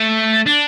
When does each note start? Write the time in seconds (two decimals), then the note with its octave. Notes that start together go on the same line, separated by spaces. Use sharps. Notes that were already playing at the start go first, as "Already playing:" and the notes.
Already playing: A3
0.46 D4